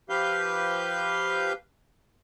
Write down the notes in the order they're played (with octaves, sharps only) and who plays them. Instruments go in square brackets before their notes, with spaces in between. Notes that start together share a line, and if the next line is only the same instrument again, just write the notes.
[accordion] F3 G4 B4 F5 G6